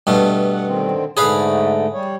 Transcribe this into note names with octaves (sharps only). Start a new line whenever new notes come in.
G2 B2 A3
F#5
D3 D#3 C4
G#2 D3 A3 G#4 B4 F5
G3 C#5